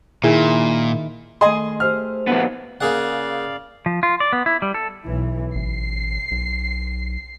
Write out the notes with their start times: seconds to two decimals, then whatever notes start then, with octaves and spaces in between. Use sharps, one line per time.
0.24 A#2 D#3 E4 G#4
1.41 D#3 A3 G#4 D#5 G#5 C6
1.80 G4 C5 E5 F6
2.27 D2 A#2 F3 B3
2.81 C#3 A#3 G#4 D5 F5 F#5
3.86 F3
4.03 F4
4.20 D5
4.33 B3
4.46 E4
4.62 G3
4.74 A4
5.06 B1 E3
5.55 A1 C7
6.31 B1